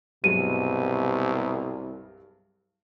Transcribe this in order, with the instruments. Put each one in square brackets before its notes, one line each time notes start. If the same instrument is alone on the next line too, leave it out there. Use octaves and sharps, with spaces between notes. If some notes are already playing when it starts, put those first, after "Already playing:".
[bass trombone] C2 [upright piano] G2 F#3 G#3 [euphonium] B2 [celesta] D#7